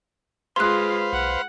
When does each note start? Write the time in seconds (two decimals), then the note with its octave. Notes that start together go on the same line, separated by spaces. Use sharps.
0.56 G#3 F4 B4 C5 F5 C6 F#6
1.13 B1 F#5